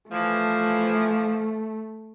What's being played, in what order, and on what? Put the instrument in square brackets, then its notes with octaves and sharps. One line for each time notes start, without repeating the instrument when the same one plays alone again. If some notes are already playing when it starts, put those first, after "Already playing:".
[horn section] E3 F3 [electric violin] A3